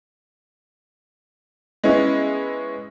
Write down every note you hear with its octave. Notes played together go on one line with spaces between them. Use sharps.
G#3 B3 C#4 E4